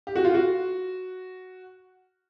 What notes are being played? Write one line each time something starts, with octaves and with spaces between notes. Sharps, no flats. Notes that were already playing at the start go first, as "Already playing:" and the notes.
G4
F#4
F4
F#4